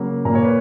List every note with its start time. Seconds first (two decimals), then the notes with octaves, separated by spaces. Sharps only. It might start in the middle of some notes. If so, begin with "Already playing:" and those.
Already playing: C#3 F#3 A#3
0.25 A#2 A#3 A#5
0.35 C#5
0.44 B4